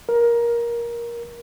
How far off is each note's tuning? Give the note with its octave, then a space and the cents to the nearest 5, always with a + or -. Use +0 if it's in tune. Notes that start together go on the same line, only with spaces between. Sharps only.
A#4 +15